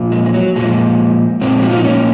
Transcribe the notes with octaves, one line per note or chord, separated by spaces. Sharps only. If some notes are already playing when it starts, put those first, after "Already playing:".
Already playing: A#2 F3
G#3
G#3
F#3
A#2 F3 G#3
A#2 F3 G#3 C4
F#4
F4
D#4
A#3 C#4